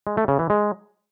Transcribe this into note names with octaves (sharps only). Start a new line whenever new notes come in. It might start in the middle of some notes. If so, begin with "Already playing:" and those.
G#3
A3
C#3
E3
G#3